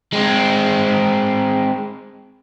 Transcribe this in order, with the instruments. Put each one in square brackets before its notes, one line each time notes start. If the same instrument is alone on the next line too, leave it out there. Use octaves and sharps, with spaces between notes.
[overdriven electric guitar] G#3 C4